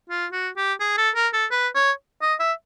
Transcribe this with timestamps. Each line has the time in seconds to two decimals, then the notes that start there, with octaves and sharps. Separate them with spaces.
0.09 F4
0.32 F#4
0.57 G4
0.80 G#4
0.97 A4
1.15 A#4
1.33 A4
1.51 B4
1.75 C#5
2.22 D#5
2.40 E5